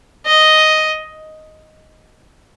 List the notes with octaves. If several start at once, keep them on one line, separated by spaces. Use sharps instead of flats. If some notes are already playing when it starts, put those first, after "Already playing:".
D#5